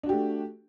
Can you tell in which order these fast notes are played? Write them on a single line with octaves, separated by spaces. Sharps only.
D4 F#4 G4 A3